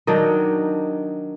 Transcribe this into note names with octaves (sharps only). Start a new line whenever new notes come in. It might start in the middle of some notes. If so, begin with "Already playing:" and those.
D#3 F#3 D4 D#4